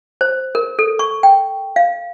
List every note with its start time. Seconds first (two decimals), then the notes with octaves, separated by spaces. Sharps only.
0.21 C5
0.55 A#4
0.79 A4
0.99 C#6
1.23 G5
1.76 F5